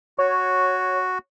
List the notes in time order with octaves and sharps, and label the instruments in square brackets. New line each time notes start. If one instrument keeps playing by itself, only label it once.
[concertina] F#4 [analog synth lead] C#5